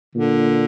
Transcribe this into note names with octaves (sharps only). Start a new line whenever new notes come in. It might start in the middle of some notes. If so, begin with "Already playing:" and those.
A#2 D3